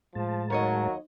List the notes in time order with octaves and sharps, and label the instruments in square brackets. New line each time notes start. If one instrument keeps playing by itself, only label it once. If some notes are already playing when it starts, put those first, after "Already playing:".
[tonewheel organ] A2 G#3 A5 [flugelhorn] F3
[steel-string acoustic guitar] D#2 C#5 D#5 [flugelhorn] F#3 [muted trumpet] A#4